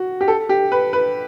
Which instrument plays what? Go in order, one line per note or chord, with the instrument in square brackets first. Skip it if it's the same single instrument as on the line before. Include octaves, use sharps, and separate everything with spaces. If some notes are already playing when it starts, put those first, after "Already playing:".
Already playing: [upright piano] F#4
G4
A4
G4
B4
B4